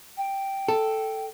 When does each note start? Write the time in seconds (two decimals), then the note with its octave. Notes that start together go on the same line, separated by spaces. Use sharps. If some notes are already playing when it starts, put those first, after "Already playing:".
0.17 G5
0.68 A4